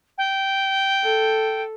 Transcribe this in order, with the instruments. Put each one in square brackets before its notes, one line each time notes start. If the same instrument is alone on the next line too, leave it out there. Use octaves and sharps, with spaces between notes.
[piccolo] G5
[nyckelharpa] A4